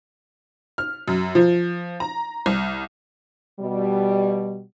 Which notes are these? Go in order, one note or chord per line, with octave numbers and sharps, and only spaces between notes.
F6
F#2
F3
A#5
C2
B2 G3